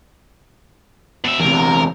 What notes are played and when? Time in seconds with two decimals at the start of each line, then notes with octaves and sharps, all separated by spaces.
1.24 B2 E5
1.40 E2 C3 A#4